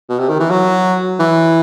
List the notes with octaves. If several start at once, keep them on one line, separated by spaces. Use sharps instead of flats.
B2
C3
D#3
E3
F#3
E3